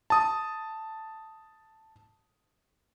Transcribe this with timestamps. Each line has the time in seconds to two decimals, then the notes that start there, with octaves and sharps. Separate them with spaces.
0.10 A5 D#6